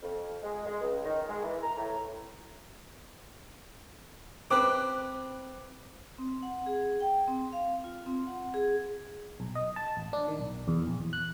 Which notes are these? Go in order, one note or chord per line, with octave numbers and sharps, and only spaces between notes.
F2
G#3
G#3
C#2
D#3
G#3
E3
A#5
A2
C4 B4 D6 F#6
C4
F#5
G#4
G5
C4
F5
F4
C4
F#5
G#4
B1
D#5
A5
A1
D4
D#3
B1
E2
A#1
E2
F#6